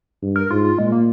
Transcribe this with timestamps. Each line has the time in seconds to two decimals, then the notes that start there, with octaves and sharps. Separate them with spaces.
0.22 G2
0.36 A#4
0.50 G#2 F4
0.64 F4
0.78 A#2 G#3
0.92 A#3